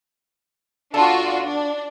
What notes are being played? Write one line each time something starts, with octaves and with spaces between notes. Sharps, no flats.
B2 D4 F4 F#4 A4 A5
D4